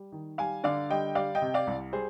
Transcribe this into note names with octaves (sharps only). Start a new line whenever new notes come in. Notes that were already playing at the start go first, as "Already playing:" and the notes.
Already playing: G3
D#3
G3 F5 G#5
D3 D5 F5
G3 D#5 G5
G3 D5 F5
D#5 G5
C3
D5 F5
C2
G3 G#4 C5